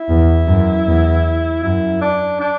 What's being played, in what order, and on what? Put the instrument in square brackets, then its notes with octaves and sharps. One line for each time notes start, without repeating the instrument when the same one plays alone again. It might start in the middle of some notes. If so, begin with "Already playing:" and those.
Already playing: [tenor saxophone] E4
[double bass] E2
F#2
E2
[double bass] F#2 [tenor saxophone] E4
[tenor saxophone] D4
D4